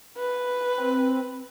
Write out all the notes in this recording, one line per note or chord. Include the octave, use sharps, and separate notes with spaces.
B4
C4